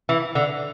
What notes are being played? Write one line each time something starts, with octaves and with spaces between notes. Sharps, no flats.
E3
D3